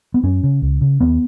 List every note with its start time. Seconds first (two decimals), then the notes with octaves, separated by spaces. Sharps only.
0.14 B3
0.23 F#2 C#4
0.43 C#3
0.62 C#2
0.81 C#3
1.00 D#2 B3